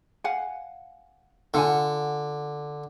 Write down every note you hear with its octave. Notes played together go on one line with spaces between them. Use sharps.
F5 F#5 G#5
D3 F4 F#5 G#5